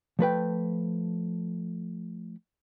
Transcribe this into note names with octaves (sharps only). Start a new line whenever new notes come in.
F3 A3 B4 G5